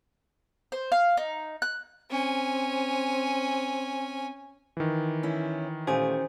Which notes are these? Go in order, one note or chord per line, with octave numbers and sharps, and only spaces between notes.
C5
F5
D#4
F#6
C4 C#4 G#5
D#3 E3
C#4 E4
A#2 A3 C#4 G4 C5 G#5